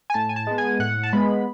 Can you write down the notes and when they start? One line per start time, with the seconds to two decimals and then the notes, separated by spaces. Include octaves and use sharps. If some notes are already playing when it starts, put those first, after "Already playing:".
0.10 G#5
0.14 A2 A5
0.29 G#5
0.36 A5
0.47 G#3 B3
0.58 G#5
0.79 A2 F#5
1.03 A5
1.13 G#3 B3 B5